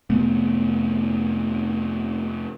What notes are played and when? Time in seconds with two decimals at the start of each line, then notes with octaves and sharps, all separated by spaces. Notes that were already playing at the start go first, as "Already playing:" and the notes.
0.10 F2 C3 A3 B3